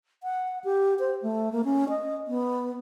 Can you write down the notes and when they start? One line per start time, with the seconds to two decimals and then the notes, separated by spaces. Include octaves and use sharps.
0.23 F#5
0.64 G4
0.99 C5
1.22 A3
1.52 A#3
1.64 C#4
1.89 D#5
2.28 B3